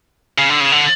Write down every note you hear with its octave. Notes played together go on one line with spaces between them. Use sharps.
C#3
D3
C#3
D3